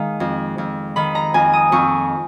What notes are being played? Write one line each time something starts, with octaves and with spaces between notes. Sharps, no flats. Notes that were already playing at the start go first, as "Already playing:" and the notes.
Already playing: D#3 G#3 F5
F2
F2
D#3 B5
A#5
F2 G#5
D#6
F2 C#6